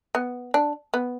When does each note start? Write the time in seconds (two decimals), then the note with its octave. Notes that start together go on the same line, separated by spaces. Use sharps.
0.15 B3
0.54 D4
0.94 B3